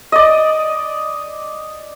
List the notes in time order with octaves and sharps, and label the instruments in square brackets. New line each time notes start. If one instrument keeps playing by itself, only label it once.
[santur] D5 D#5